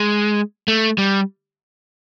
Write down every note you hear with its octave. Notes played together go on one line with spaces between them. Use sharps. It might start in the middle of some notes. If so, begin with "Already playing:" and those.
Already playing: G#3
A3
G3